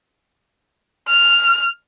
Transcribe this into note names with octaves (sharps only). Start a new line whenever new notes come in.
F6